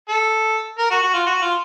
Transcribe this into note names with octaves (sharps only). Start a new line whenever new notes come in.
A4
A#4
F#4
F#4
F4
F#4
F4